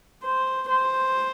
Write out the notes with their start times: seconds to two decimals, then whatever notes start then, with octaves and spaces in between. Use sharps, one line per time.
0.24 C5
0.70 C5